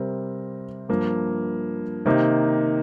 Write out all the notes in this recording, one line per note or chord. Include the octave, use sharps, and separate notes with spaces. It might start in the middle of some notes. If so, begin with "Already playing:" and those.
Already playing: C3 G3 C4 G4 A#4
G2 F3 A#3
C3 D#3 A#3 D#4 G4